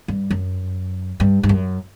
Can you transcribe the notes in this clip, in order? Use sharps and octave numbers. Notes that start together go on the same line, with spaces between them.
G2
F#2
G2
G2
F#2